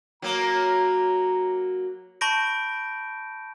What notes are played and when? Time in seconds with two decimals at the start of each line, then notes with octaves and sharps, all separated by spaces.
0.22 F#3 A#3 A#5
2.21 A5 B5 C#6 G6 A#6 D7